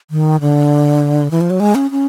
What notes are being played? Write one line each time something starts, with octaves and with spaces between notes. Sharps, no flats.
D#3
D3
E3
F3
F#3
G#3
C#4
C#4